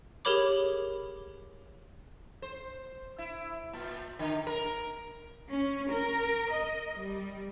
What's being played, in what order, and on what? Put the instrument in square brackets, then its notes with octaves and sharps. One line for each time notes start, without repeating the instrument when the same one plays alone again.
[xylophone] G4 G#4 A#4 C#5 B5 D6
[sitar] C5
E4
A#2
D3
A#4
[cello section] C#4
A#4
D#5
G3